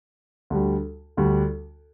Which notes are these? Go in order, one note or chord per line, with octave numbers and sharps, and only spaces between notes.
D2 D3 G3
D2 D3 G3